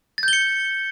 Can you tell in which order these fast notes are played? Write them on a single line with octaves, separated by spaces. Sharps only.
A6 G6 G7 C#7